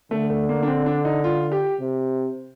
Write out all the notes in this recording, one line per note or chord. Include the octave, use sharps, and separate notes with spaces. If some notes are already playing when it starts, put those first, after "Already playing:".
D3 A3
A3
A#3
D4
C4
D4
D#4
F4
G4
C3